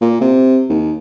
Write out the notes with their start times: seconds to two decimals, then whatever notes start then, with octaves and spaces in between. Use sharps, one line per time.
0.01 A#2
0.21 C3
0.69 D#2